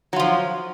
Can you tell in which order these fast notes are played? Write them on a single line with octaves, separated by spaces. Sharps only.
F#3 F4 F3